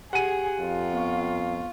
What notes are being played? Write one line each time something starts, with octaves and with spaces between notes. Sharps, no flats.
G4 G#4 F#5 G#5 D#7
F2 F4
B3 C#6